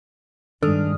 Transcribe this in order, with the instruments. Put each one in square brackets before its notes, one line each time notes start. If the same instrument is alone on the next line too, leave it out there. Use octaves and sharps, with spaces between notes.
[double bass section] G2 G#3 [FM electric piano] D#3 D#6 F6 [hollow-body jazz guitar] D4 [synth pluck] A4